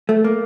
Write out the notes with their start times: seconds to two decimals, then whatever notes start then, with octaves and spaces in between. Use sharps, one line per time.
0.09 A3
0.24 A#3